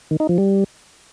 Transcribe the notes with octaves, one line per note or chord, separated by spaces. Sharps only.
D#3
D#4
F3
G3